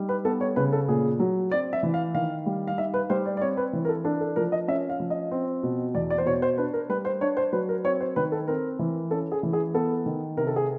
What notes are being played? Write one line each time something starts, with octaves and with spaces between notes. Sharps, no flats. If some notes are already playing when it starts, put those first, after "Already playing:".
Already playing: G3 D#4
B4
B3 A4
C#5
C#3 B4
A4
A#2 G#4
F#3
C4 D5
E5
E3
F5
D#3 F5
G3
F5
D#4 E5
B4
G3 C5
D5
D5
C4 C#5
B4
E3
A#4
A4
D4 A4
A4
F3 A#4
D#5
C#4 E5
F5
F3
D#5
C4
B2
E2 D5
D5
C5
B2 C#5
C5
D4 B4
A#4
G3 B4
C5
D4 C#5
C5
F#3 B4
A#4
C4 C#5
C5
D#3 B4
A4
C4 A#4
E3
C#4 A4
G#4
E3
G#4
B3 A4
D#3
C3 A#4
A4
G#4